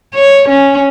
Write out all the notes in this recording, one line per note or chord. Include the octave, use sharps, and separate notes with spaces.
C#5
C#4